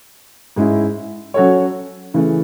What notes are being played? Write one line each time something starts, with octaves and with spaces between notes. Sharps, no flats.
G#2 G#3 C#4 E4
F#3 C#4 F#4 A4 C#5
C#3 E3 A3